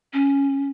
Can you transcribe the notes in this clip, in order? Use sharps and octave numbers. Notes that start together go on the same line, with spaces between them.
C#4